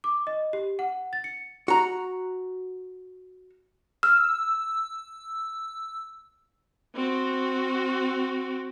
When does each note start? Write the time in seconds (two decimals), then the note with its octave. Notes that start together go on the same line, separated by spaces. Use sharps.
0.04 D6
0.27 D#5
0.53 G4
0.79 F#5
1.13 A6
1.24 C#7
1.68 F#4 A#5
4.03 E6 F6
6.96 C4 F#4